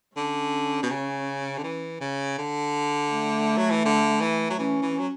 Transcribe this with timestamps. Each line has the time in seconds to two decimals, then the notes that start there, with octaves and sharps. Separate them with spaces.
0.17 D3 C#4
0.83 B2
0.91 C#3
1.58 D3
1.64 E3
2.01 C#3
2.38 D3
3.11 A3
3.58 F#3
3.71 E3
3.85 D3
4.21 E3
4.50 F#3
4.58 E3 C#4
4.82 E3
4.99 F#3